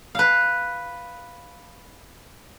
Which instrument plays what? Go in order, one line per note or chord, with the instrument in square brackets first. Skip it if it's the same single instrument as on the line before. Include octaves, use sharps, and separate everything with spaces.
[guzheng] B4 F5